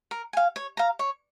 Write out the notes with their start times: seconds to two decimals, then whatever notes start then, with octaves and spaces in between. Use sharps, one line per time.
0.11 A#4
0.33 F5 G#5
0.56 C#5
0.77 F5 A#5
0.99 C#5